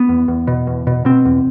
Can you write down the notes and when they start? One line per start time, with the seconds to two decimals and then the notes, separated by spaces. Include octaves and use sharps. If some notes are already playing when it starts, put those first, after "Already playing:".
Already playing: B3
0.09 E2
0.28 E2
0.47 B2
0.67 E2
0.87 B2
1.05 B2 C4
1.25 E2